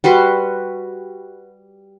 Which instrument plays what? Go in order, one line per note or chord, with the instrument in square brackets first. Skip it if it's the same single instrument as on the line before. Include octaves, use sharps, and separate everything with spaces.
[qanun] G3 F#4 B4 C6